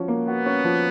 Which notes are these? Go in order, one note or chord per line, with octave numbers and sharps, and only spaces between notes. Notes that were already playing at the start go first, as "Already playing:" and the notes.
Already playing: F3 C#4 F#4
A#3
B3 F#4
C#4
F3